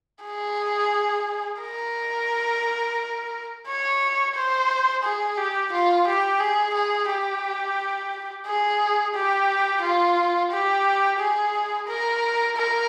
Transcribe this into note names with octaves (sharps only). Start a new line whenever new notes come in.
G#4
A#4
C#5
C5
G#4
G4
F4
G4
G#4
G#4
G4
G#4
G4
F4
G4
G#4
A#4
A#4